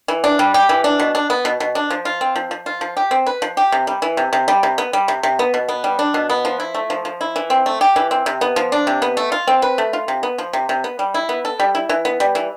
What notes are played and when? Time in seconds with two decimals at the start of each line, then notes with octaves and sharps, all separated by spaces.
0.08 E3
0.24 D4
0.39 G3
0.54 G4
0.69 E3
0.84 D4
1.00 B2
1.15 D4
1.30 B3
1.45 B2
1.60 B2
1.75 D4
1.90 F3
2.05 F4
2.21 C4
2.36 F3
2.51 F3
2.66 F4
2.81 F3
2.97 G4
3.11 C4
3.26 B4
3.42 F3
3.57 G4
3.72 C3
3.87 G3
4.02 E3
4.17 C3
4.33 C3
4.48 G3
4.63 C3
4.78 B3
4.93 G3
5.08 C3
5.23 C3
5.39 B3
5.54 B2
5.69 B3
5.84 G3
5.99 D4
6.14 B2
6.30 B3
6.45 F3
6.60 E4
6.75 A3
6.90 F3
7.05 F3
7.21 E4
7.36 E3
7.50 C4
7.66 A3
7.81 G4
7.96 E3
8.11 C4
8.26 C3
8.41 B3
8.56 F3
8.72 D4
8.87 C3
9.02 B3
9.17 A3
9.32 F4
9.47 C4
9.62 B4
9.78 A3
9.93 F4
10.08 C3
10.23 B3
10.38 F3
10.53 C3
10.69 C3
10.84 B3
10.99 G3
11.14 E4
11.29 B3
11.45 A4
11.60 G3
11.75 E4
11.89 E3
12.05 B3
12.20 G3
12.35 E3